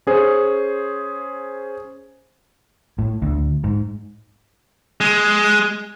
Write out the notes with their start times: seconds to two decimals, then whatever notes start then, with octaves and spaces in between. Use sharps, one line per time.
0.07 C#4 G#4 C5
2.99 A2
3.22 D2
3.64 G#2
5.01 G#3